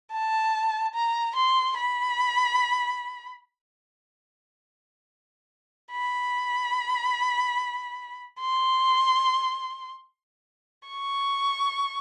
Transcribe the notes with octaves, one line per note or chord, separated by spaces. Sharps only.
A5
A#5
C6
B5
B5
C6
C#6